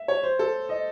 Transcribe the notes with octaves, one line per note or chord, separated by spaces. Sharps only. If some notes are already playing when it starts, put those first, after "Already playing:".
Already playing: E5
C#5
C5
A4
D#5